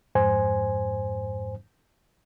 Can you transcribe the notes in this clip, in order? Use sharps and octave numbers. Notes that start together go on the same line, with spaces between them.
F2 G#2 C5 G#5